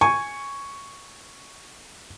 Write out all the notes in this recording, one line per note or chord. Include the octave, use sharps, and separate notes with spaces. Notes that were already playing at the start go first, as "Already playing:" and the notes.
G#5 C#6